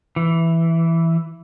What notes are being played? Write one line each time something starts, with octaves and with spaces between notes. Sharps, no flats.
E3